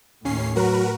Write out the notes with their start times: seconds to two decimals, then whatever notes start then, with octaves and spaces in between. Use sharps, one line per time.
0.25 D#2 A2 C#4 C7
0.56 F#3 F#4 A#4 B4